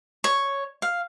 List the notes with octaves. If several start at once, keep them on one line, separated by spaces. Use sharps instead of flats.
C#5
F5